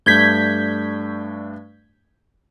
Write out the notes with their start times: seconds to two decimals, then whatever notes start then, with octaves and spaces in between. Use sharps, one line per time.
0.06 G2 A3 D4 G6 G#6 B6